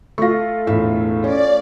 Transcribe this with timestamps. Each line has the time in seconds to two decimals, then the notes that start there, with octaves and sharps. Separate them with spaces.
0.18 A3 F4 C#6 A#6
0.67 E1 A2 E5
1.24 C#4 D5